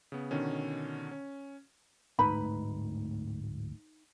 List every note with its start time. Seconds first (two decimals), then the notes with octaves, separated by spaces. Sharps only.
0.12 C#3 B3
0.31 B2 D3 D#3 C#4
1.11 C#4
2.19 D1 G#2 A3 D#4 B4 B5